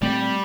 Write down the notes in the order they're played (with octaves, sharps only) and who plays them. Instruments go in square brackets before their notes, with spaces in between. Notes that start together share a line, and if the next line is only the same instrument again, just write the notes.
[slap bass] A#2 A3 C4 [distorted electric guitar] G3